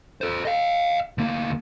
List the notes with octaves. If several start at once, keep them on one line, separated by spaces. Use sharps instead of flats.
A4 C5
D#5 F5
D2 A#3